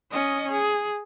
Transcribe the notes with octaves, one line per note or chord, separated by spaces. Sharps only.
C#4 D#5
G#4